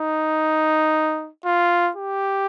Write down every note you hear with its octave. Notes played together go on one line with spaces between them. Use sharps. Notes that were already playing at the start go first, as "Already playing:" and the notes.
Already playing: D#4
F4
G4